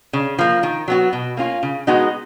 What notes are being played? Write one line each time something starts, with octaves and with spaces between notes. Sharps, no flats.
C#3
F3 A#3
D#3
F#3 B3 F#4
B2
A#3 C#4 F4
C#3
G#3 B3 D#4 F#4